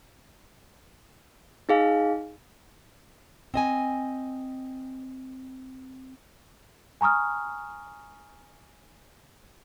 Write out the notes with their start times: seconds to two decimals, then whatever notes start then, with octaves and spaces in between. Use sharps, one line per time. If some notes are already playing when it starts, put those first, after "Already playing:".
1.69 D#4 G#4 F5
3.54 C4 D#5 G#5
7.01 G#5 A#5 C#6 D#6 F6